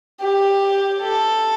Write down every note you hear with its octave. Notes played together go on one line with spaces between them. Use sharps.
G4
A4